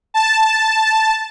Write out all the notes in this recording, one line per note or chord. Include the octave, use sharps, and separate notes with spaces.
A5